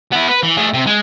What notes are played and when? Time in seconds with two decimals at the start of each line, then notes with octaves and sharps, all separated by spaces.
0.12 B3 E4
0.29 B4
0.43 E3
0.57 A3 G#4
0.74 C3
0.87 G#3